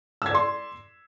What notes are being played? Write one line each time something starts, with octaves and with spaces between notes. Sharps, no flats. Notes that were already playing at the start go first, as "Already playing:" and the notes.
D5 C6 E6 G#6